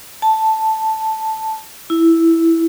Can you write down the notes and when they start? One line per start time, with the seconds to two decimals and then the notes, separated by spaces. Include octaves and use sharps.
0.22 A5
1.90 E4